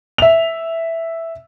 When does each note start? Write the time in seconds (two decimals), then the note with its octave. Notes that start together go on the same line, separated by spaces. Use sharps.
0.18 E5 F7